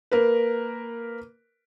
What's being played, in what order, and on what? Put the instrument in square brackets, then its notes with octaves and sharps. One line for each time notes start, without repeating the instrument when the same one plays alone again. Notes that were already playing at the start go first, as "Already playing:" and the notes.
[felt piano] A#3 A#4 B4